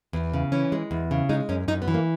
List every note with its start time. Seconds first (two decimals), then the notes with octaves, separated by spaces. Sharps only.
0.13 E2
0.34 C#3
0.52 E3 C#4
0.72 G#3
0.91 E2
1.11 C#3
1.29 G#3 D#4
1.49 F#2 C#4
1.68 F#2 D#4
1.82 B3
1.88 E3
1.94 A#3